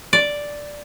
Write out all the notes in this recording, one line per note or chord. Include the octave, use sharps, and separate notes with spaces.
D5